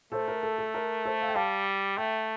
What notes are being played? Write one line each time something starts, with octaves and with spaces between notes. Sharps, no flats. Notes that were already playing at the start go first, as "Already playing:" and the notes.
A3 A4 C5
A#4
A4
A4
A#4
A4 C5
F5
G5
G3 F5 A5
A3 E5 G5